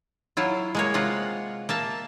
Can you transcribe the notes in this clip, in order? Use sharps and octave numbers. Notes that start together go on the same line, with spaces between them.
F#3 E4 F4
G#3 A#3 C#5
C3 F4 D#5 F#5
A#3 E5 A5